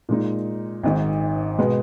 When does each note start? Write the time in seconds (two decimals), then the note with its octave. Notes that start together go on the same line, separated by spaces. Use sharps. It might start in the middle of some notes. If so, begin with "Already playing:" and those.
0.09 A#2 G#3 D#4
0.83 G#1 G#2 D#3
1.58 B2 G#3 B3